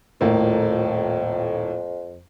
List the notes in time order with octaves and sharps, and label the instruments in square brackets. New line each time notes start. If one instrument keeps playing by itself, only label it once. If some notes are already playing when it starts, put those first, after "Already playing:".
[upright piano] D#1 A2 A#3 [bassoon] F2